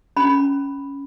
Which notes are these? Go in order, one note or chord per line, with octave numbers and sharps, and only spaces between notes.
C#4 B5